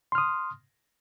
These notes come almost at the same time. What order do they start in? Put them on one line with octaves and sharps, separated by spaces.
C6 F6 D#6